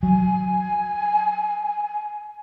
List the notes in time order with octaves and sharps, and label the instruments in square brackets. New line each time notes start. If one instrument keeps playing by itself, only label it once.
[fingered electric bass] F#3 [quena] G#5